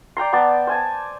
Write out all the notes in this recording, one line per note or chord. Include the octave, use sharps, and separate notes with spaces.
D5 G5 A#5 C6
B3 D5 A5
C5 G#5 A5